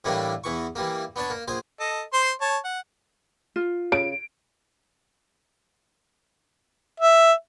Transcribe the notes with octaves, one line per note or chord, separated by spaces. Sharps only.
A2 E3 G3 A3 A#3 D4
E2 E3 C#6
E3 G3 A#3
B3 D4 C#5 A5
A#3
A#1 G#4 C5
A4 D#5
C5 C6
C#5 A5
F#5
F4
C#3 D7
E5